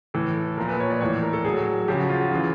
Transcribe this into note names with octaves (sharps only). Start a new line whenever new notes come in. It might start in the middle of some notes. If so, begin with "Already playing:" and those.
A2 E3 A4
A#2 F3 A#4
B4
C#5
D5
A2 E3 C#5
A#4
A4
A2 F#3 G#4
C#3 F3 G4
F#4
F4
F#4
C#3 E3 F4